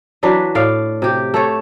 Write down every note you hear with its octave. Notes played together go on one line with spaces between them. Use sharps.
E3 F#3 D4 B4
A2 D5 F5
C3 G4
A3 A4 C#5